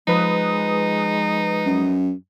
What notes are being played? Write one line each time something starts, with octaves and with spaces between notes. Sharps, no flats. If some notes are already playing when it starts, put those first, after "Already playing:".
F3 G#3 D#4 B4 D#6
F#2